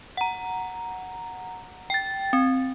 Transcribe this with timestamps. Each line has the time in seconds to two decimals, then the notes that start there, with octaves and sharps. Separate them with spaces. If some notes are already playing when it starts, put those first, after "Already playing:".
0.17 F#5 A#5
1.90 G5 A6
2.33 C4